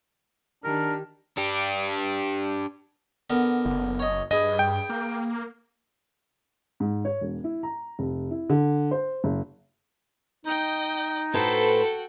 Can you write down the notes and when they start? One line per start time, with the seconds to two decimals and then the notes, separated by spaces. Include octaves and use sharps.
0.64 D#3 D4 G4 A#4
1.37 D4 G4
3.30 D3 B3 A#4
3.65 F#1
4.00 C#5 D#5
4.31 G2 G#4 B4 D#5
4.59 G5
4.90 A#3
6.80 G#2
7.05 C#5
7.21 E1
7.44 E4
7.63 A#5
7.99 F1
8.31 E4
8.50 D3
8.91 C5
9.24 F#1
10.45 D#4 D#5 G5
11.34 A2 F#4 A4 B4 C5 G5